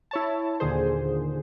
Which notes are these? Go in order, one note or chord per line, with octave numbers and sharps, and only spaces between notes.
E4 C#5 A5
D#2 A#2 D3 G#4 C5